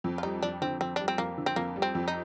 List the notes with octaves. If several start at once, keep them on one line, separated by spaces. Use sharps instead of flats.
F2
F4
G3 D#4
F2 D4
D3 C4
F2 C4
G3 D4
C4
F2 A#3
D3
C4
F2 A#3
G3
C4
F2
D#4